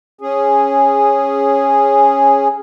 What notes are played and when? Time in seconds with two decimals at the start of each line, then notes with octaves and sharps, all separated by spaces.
0.21 C#4 G#4